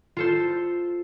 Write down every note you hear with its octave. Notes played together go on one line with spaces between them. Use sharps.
F4 A4 C5